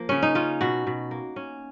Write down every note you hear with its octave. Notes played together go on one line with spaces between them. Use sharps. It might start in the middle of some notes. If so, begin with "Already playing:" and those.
Already playing: F3 A#3
C#3 C#4
D#4
C#4 F4
B2 F#4
B2
A#3
C#4